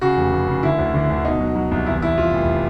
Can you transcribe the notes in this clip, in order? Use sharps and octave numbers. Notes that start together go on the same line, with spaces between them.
C#3 F#4
F1
F1
C#3
D3 E4
D2
D3
D2
B2 D#4
F#3
F#3
C2
E2 E4
E2 E4
F3 F4
F1